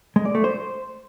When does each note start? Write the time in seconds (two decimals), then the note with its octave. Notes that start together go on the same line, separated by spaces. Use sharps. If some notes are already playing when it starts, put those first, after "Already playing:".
0.16 G#3
0.25 D5
0.35 A3
0.44 C5